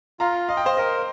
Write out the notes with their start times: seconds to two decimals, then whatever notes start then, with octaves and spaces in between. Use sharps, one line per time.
0.20 F4 F5 A#5
0.49 D#5 F5
0.57 G5
0.65 C5 F5
0.77 A#4 D#5